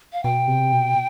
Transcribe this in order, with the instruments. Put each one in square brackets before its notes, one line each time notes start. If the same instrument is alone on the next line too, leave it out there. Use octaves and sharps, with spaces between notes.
[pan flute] F5
[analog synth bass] B2 [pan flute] G5
[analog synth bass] C3
B2